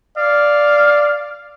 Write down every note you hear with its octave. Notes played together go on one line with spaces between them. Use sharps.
D5 F5